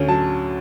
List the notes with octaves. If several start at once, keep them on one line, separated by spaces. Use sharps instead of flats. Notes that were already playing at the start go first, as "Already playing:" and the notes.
Already playing: D2 D3 C#4
F#3 A5